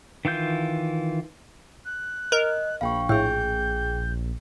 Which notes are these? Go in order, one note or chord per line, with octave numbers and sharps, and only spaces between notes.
D#3 E3 F4 G6
F#6
A#4 D#5
A#1 F5 G5 B5 C#6
A2 G#4 G5 G6